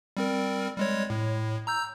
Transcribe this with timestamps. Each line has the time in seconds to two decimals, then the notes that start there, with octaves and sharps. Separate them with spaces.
0.17 G3 C4 A#4
0.77 G3 G#3 C#5
1.10 A2
1.67 A#5 E6 G6